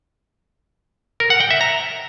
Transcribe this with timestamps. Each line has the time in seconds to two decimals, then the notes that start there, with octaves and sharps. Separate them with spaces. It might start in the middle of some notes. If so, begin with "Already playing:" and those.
1.20 A#4
1.30 F#5
1.40 G5
1.51 E5
1.61 A#5